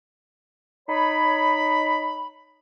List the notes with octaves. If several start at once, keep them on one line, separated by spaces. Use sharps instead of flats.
D#4 C#5 B5